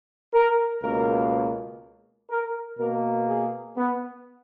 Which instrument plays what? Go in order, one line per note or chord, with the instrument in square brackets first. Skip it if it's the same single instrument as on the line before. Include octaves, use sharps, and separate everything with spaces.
[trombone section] A#4
C#2 B2 A#3 A#4
A#4
B2 A#3 A#4
G#4
B3